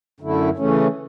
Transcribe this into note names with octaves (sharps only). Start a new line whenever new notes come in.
F#2 D3 A3 E4
C#3 E3 A3 C#4